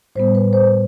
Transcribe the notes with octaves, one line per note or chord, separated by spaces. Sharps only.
A2 G3 B3 C5
B4
C5